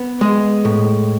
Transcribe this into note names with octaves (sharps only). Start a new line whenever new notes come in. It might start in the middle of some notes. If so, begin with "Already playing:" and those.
Already playing: B3
G#3
A2